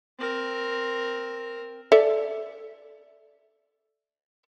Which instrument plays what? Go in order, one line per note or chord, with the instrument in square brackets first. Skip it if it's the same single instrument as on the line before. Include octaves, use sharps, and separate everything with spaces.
[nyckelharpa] C4 A#4
[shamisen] A4 D5 E5